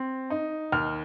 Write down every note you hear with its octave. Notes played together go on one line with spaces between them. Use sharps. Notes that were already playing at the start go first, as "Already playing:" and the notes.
Already playing: C4
D#4
D#2 F6